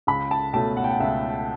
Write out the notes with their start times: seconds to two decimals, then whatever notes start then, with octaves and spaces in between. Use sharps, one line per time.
0.07 C#2 B5
0.31 A5
0.53 B2 A3 C#4 A5
0.77 F#5
0.84 G5
0.91 F#5
1.00 C#2 E5